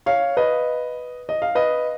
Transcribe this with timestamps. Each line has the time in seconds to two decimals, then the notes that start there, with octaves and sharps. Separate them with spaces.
0.06 C#5 F5
0.37 B4 D#5
1.29 D#5
1.42 F5
1.55 B4 D#5